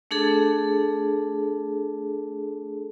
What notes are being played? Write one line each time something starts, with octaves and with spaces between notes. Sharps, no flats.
A3 D4 G#4 A4